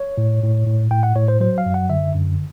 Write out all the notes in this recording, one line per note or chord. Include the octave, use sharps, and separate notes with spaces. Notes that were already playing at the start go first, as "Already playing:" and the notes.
Already playing: C#5
A2
A2
A2
A2 G5
F#5
A2 C#5
C5
F#3 C5
F5
F#2
F#5
D3 E5
F#2